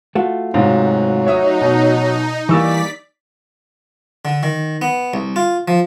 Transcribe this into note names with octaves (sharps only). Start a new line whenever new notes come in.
A3 F4 F#4
G#2 C3 F#3 F5
D#4 C#5 E5 D#6
B2
E3 G3 A#3 D5 C#6 E6 A6 B6
D3
D#3
B3
C2
F4
F3